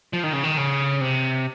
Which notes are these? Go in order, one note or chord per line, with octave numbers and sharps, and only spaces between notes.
F3
D#3
C#3
D#3
C#3
C3